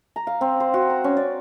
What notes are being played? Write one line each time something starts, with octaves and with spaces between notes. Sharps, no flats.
A#5
F5
C4
C5
F#4
A#5
C#4
D5